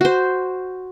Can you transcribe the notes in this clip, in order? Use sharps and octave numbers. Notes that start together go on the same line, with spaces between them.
F#4 C5